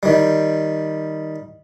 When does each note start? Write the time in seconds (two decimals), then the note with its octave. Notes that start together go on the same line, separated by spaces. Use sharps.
0.03 D#3 G3